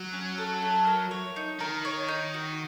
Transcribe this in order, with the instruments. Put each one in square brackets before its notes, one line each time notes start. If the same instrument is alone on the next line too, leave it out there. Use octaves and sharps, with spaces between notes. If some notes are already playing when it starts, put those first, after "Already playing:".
Already playing: [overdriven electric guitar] F#3
[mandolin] C#4
A4
A3
A#4
C#5
D#4
[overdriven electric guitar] D#3 [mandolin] A#4
[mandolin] C#5
D#4
F#4